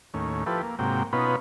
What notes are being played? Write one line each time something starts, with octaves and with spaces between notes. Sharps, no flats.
D#2 A2 C#4
F3 E4 G4 A4 B4
A#3
G#2 C3 F#3 A#3 G5
B2 B3 C#4 D#4 F4 B5